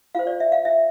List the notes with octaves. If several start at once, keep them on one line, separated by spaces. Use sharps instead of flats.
F4 C5 F5
D5
E5
F5
E5